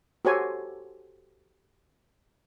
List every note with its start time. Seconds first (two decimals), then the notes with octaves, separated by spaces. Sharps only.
0.25 F#4 G4 A4 C5 C#5 G#5